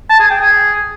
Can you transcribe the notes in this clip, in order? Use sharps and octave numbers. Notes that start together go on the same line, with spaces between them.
A5
G#4
G5
G#4